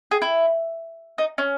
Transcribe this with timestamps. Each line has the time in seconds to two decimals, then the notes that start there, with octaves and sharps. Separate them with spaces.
0.11 G#4
0.22 E4
1.18 D#4
1.38 C#4